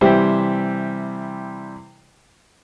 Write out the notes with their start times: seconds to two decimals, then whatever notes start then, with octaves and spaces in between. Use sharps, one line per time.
0.01 C3 E3 G3 C5 E5 G5